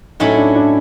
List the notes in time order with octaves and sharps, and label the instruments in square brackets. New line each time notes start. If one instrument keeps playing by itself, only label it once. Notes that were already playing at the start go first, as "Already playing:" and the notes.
[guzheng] A2 F#3 A3 C#4 E4 [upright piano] D#4
[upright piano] D4
D4